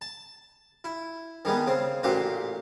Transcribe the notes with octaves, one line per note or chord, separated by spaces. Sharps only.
A5
E4
D#3 G3 G#3 B3
C#3 C4
A1 A#2 F#4 G4 C5